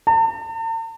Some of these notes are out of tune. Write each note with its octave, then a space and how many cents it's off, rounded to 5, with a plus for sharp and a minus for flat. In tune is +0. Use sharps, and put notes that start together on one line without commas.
A5 +45